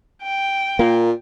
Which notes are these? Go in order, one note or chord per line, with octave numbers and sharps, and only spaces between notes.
G5
A#2 A#3